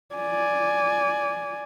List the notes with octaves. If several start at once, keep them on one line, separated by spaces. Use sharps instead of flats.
D5 G#5